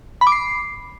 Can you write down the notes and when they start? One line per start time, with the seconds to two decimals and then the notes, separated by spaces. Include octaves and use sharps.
0.21 B5
0.27 D6
0.32 C7